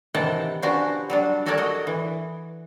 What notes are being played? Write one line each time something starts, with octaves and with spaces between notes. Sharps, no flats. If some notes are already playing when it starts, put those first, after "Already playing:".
C3 D#3 E3 F#5 G5 A5
F3 B3 C#4 D4 F#4 G4
F#3 G3 D4
F#3 F#4 A4 A#4 C#5 D5
F#4 D#5
E3